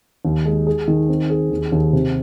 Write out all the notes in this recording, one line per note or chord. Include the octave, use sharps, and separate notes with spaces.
D#2
G#3
G#4
D#3
C4
G#4
D#2
D#2
C3